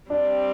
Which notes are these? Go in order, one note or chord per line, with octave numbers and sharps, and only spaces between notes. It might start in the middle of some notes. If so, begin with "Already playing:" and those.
G3 C4 D4